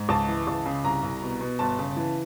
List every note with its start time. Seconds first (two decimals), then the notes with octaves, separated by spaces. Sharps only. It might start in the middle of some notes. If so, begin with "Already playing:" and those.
Already playing: G#2
0.09 C#2 A5
0.28 E3
0.47 C#2
0.66 C#3
0.84 C2 A#5
1.03 C2
1.22 B2
1.41 B2
1.59 G1 A5
1.78 C#3
1.97 E3